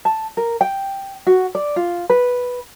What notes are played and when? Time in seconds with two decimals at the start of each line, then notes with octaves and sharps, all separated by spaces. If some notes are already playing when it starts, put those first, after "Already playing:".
0.05 A5
0.37 A#4
0.61 G5
1.27 F#4
1.55 D5
1.76 F4
2.10 B4